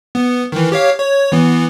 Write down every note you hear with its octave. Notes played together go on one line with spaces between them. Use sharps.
B3
D#3 E3
G4 C#5 F5
C#5
E3 B3